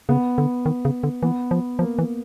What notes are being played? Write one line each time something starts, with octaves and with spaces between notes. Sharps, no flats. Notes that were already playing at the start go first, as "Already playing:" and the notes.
C#3 B3
D3
D#3
C#3
D3
E3 B3
F3
F3 A#3
E3